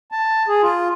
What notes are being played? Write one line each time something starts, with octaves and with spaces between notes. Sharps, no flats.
A5
G#4
F4